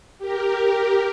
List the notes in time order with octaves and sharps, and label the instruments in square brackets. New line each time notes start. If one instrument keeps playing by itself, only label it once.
[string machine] G4 A#4